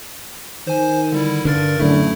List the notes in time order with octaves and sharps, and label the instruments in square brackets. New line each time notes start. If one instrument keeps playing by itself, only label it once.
[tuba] D#3 [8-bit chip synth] C5 G#5
[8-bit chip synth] D3 G3 E4
[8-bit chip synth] G2 A#4 A6 [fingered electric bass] D3
[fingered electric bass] F#2 A2 [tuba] D3 [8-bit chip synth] A3 E4